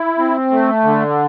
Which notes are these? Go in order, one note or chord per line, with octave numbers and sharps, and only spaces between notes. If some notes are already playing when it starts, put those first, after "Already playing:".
Already playing: E4
C4
A3
D3